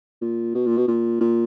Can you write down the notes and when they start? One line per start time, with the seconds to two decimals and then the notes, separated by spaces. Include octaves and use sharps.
0.21 A#2
0.55 B2
0.66 A#2
0.77 B2
0.88 A#2
1.21 A#2